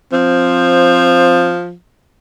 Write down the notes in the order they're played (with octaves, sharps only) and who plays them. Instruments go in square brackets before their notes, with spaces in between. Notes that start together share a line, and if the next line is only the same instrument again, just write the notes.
[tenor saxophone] F3 [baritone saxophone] C4